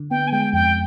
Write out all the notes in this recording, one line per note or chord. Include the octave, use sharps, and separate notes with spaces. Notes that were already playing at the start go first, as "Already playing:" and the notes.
Already playing: D3
B3 G5
G#5
G#3 G5
F2 G5